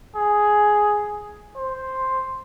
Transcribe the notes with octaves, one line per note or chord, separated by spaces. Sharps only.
G#4
C5